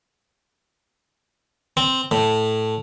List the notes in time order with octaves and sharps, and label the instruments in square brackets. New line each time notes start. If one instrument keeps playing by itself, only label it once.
[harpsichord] C4
A2